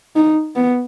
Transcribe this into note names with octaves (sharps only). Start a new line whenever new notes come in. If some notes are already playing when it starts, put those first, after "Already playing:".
D#4
B3